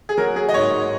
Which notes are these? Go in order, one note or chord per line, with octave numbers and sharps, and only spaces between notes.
G#4
F#3 A#4
F#3 G#4
D#5
G#2 C#5
G#2